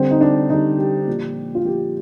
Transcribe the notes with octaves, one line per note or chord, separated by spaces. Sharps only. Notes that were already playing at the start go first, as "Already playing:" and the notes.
Already playing: D3 G3 C4
D#4
D4
D3 G3 D#4
G4
A#2 F3
F4
A#2 F3 G4